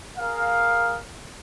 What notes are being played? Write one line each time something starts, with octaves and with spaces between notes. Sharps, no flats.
G#4 A#4 F5